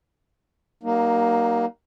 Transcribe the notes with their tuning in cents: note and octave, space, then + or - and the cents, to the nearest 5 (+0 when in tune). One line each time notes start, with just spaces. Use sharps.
G3 -45 A#3 +10 D#4 -10